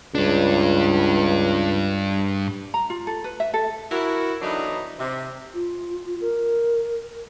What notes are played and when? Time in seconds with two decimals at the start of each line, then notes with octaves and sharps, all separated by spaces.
0.15 C#2 G2 D4
2.74 A#5
2.90 F4
3.07 A4
3.24 B4
3.40 E5
3.54 A4
3.90 E4 F#4 A#4
4.41 D3 E3 F#3 B3 D4 D#4
4.99 C3
5.54 F4
6.21 A#4